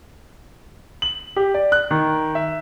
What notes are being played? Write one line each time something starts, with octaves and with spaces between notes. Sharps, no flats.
F#7
G4
D5
F#6
D#3
E5